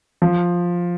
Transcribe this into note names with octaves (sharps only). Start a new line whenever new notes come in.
F3